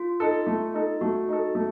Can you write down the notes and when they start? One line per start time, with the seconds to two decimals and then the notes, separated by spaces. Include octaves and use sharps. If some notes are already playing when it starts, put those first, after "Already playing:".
Already playing: F4
0.20 D#4 A4
0.47 A3
0.74 D#4 A4
1.01 A3 F#4
1.28 D#4 A4
1.55 A3